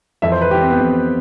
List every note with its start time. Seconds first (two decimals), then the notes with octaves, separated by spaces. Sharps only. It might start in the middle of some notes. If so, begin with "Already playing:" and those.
0.22 F2 E3 E5
0.32 C5
0.41 B4
0.51 F2 G4
0.54 E3
0.61 C4
0.70 B3
0.80 F2 E3